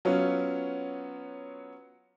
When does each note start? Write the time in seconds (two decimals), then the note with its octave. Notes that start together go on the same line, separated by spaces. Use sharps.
0.05 F#3 B3 C#4 F4